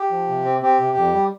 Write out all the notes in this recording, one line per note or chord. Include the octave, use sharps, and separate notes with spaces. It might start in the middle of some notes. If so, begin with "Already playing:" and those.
Already playing: G4
F3
C3
C4
C4 G4
C3
F2
G3